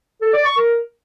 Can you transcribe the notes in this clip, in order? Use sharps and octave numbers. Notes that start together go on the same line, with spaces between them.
A4
D5
C#6
A#4